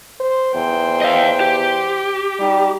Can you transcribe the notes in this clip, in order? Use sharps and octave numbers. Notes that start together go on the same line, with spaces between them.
C5
E2 C5 G5
D#5 F5
G4
G3 D#4